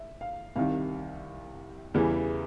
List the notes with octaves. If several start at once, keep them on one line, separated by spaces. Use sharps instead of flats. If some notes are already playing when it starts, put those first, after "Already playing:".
Already playing: E5
F5
C2 C3 D#3 F5
E2 C#3 E3 G3